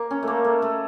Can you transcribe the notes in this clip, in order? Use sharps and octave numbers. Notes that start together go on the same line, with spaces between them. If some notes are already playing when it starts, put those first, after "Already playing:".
Already playing: A#3
C#4
A3 A#3
A3
A3